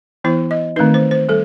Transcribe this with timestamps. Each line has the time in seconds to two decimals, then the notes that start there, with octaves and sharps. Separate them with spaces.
0.24 E3 B3 E4 C5
0.51 D#5
0.76 D#3 A3 C4 D#4 B4
0.94 C5
1.11 C5
1.29 G3 A4